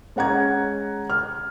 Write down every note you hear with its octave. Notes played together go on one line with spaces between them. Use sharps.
G#3 C#4 F#5 A#5 G#6
F6